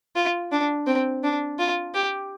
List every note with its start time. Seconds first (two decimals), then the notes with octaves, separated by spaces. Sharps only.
0.16 F4
0.52 D4
0.87 C4
1.23 D4
1.59 F4
1.94 G4